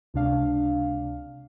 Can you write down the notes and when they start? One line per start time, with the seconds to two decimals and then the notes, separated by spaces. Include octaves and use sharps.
0.14 C#2 C3 D4 F5